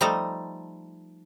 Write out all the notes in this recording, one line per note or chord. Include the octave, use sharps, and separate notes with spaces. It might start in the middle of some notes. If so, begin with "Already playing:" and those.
F3 G3 A3 D#4 A4 A#5